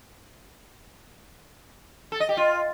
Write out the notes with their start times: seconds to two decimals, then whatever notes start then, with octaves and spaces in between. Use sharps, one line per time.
2.12 A4
2.20 D#5
2.29 G4
2.37 F4